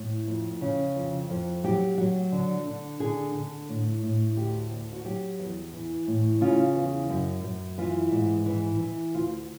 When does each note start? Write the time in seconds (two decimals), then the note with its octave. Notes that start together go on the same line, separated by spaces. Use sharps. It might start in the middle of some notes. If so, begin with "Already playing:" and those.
Already playing: A2
0.27 F2
0.61 C#3
0.96 F2
1.30 F2
1.64 F#3 G4
1.98 F#3
2.32 D3
2.66 D3
3.00 D3 G#4
3.35 D3
3.69 A2
4.03 A2
4.37 D2 G4
4.71 D2
4.93 F#4
5.04 F#3 G4
5.39 E2
5.73 E3
6.07 A2
6.41 C#3 F4
6.75 E2
7.09 F#2
7.44 F#2
7.78 E3 F4
8.12 G#2
8.46 E3
8.80 E3
9.14 D2 F4